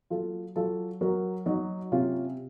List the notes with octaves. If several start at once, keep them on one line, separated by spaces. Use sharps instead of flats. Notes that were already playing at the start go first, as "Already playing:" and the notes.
F#3 F4 A4
F#3 F4 A4
F#3 F#4 A#4
F#3 D#4 F#4
C3 C#4 F4